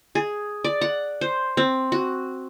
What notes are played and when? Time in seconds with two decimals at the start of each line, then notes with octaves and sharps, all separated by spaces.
0.15 G#4
0.65 D5
0.81 F#5
1.21 C5
1.57 C4
1.92 F#4